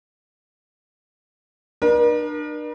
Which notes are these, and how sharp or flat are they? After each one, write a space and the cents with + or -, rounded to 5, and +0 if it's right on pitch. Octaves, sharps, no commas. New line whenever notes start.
D4 +40 A#4 +45